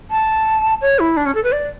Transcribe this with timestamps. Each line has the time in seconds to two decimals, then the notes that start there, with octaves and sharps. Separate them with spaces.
0.10 A5
0.81 C#5
0.99 E4
1.17 D4
1.26 C#4
1.35 A4
1.44 B4
1.52 D5